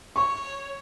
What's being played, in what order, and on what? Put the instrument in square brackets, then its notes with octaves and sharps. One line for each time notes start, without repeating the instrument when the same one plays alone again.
[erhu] C#5 [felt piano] C#6